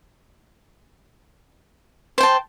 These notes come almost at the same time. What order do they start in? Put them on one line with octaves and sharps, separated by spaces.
C5 G5 A5